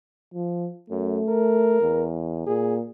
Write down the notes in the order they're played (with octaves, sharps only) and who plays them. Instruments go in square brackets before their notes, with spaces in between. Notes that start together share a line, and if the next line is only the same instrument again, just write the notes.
[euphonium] F3
[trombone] F#2 [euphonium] A3
[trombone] A#4
[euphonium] E2
[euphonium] A#2 [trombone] G#4